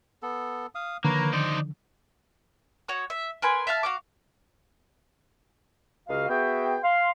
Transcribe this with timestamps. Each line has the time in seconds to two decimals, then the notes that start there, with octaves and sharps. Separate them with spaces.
0.22 B3 A4
0.75 F5 D#6
1.05 D3 D#3 F3 A#3 B4 C#5 A#5
1.33 D#4 C5 D5
2.88 F#4 C#5 D#6
3.10 E5
3.42 A#4 B4 G#5 C6
3.67 E5 F5 A5 F6
3.83 F#4 F5 D6
6.08 C#2 C#3 F#4 D#5 F5
6.29 B3 F#4 G#4 E5 G5
6.83 F5 C6